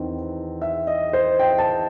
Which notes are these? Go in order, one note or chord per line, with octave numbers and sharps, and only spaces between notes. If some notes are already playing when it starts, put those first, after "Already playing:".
Already playing: E2 D#3 C4
E5
D#5
C5
G5
A5